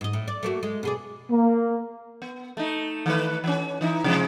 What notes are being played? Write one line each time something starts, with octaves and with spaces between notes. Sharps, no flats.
G#2 D#5
A2
D5
A3 A#3 F#4
G#3
B2 G#4 D5
A#3
B3
A3 D#4
D#3 A3 B4
E3 C#4
E3 D#4 E4
C3 F3 G#3